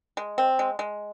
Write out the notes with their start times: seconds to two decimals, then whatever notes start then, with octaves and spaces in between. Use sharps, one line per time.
0.17 G#3
0.38 C4
0.59 G#3
0.79 G#3